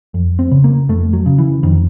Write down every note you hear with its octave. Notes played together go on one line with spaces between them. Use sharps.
F2
C4
C#3
A#3
F2 A3
F#3
C#3
E3
F2 D#3